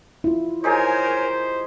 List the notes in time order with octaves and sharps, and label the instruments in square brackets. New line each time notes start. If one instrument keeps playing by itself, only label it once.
[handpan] E4 F4
[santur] D#4 G4 G#4 [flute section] A#4 C#5 G#5 [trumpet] C5